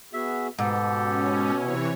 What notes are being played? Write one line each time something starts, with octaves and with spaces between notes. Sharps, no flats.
B3 F#4 G#4 E5
G#2 B2 B3 G4 A4
C#4
C3 E3 E4 C#5